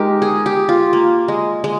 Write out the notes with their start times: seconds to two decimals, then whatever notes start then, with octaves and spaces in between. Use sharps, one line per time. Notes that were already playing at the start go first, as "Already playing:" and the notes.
Already playing: G#3 D#4 G4 A#4
0.22 G#4
0.46 G4
0.69 F4
0.93 A#3
1.28 G#3
1.64 G#3